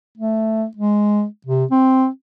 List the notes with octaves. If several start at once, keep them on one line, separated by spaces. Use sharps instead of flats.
A3
G#3
C3
C4